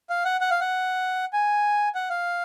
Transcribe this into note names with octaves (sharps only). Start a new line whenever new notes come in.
F5
F#5
F#5
F5
F#5
G#5
F#5
F5